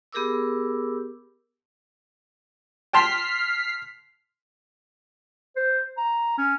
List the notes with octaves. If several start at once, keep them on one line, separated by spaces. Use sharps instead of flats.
B3 G4 G#4 A#4 D6 E6
G5 A5 C6 F6 B6 C7
C5
A#5
C#4